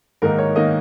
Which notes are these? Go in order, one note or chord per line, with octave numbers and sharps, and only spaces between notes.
G#2 D#3 A#3 D#4 A#4
C#5
D#3 A#3 D#4 D#5